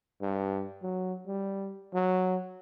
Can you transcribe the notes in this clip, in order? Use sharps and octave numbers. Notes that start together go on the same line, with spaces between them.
G2
F#3
G3
F#3